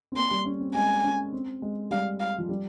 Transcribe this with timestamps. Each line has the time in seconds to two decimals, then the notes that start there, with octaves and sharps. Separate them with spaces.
0.12 C4
0.16 A#3 C6
0.31 G3
0.45 C#4
0.60 C4
0.75 G#3 G#5
1.04 C#4
1.32 C4
1.62 G#3
1.91 G3 F5
2.20 F5
2.38 F3
2.49 G3